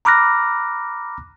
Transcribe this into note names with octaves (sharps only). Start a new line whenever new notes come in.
A#5 B5 D6 F6 F#6 A#6